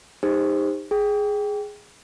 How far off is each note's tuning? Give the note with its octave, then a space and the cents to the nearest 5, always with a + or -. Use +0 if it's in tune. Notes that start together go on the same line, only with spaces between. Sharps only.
D#4 +0 G4 +40 C5 +5
G#4 +0 G5 -10